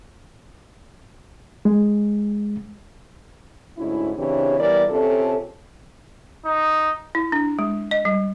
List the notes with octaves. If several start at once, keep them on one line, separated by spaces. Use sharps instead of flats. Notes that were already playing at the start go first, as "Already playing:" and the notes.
G#3
D2 G#2 C#4 E4
C#3 E3 C4 D4 G4 C#5
E3 G3 B3 A#4 D5
C3 C#4 F4 A4
D#4
E4
D4
G#3
D#5
G3